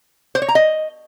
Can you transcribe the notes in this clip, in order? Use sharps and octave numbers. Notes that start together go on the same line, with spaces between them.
C5
C#5
A#5
D#5